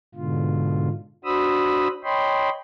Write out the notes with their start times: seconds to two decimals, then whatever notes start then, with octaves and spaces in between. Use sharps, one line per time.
0.15 G#2 B2 D3 F4
1.25 D4 F#4 C5 B5 D#6 E6
2.04 C#5 D#5 G5 B5 C6